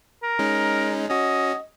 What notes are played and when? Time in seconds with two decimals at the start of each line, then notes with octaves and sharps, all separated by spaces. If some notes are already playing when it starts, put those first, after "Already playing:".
0.23 A#4
0.39 G#3 C#4 D#4
1.09 C#4 F#4 D#5